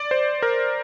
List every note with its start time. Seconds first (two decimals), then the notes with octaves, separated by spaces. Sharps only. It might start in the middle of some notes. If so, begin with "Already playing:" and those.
Already playing: D5
0.11 C5
0.42 A#4